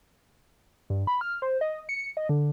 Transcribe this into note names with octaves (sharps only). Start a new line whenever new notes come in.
G2
B5
F6
C5
D#5
C#7
D#5
D3